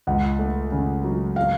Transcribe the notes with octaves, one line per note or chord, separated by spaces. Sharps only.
C#2 F#5
A3
C#3
F#3
F5